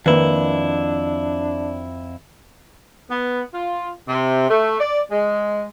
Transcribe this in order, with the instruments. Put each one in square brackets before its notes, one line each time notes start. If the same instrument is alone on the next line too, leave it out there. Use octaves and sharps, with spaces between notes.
[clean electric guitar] F2 E4 [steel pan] D#3 A#3 [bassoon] D4 [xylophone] B4
[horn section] B3
F4
C3
A3
D5
G#3